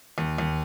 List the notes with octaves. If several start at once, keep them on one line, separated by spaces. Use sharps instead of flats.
D#2
D#2